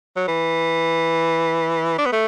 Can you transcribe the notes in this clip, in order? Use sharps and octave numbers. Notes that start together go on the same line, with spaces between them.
F#3
E3
D4
B3
A3